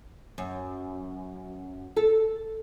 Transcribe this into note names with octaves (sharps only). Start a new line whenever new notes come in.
F#2
A4